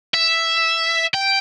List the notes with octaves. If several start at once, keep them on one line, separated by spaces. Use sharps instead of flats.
E5
G5